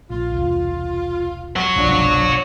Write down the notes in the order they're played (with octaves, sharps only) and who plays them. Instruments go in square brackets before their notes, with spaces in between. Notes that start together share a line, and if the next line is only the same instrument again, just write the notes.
[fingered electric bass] A#1 [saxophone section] F4
[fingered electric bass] E1 C2
[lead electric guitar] C#5 F#5
[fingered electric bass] G1 C2 B2 [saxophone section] F3 D4